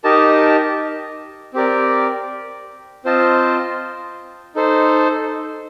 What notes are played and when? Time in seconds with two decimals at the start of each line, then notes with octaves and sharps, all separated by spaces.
0.04 D#4 G4 A#4 D#5 A5
1.54 C4 G4 A#4 D5
3.05 C4 F4 C5 D#5 A5
4.55 D#4 A4 C5